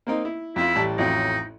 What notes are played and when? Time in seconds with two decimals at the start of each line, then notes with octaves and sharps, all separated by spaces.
0.07 A#3 C4 D#4
0.25 E4
0.56 F2 E4 F4
0.75 A1 G3 A5
0.98 A1 F2 F#3 D#4